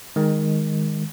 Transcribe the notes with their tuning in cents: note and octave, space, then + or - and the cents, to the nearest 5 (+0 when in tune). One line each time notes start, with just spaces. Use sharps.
D#3 +0 G#3 -15